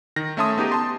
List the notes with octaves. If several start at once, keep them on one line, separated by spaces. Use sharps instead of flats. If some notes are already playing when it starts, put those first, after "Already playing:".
D#3 A#6
A3 C#4 E5 A5 C6 D#6
B3 D#4 G4 G#4
A5 C6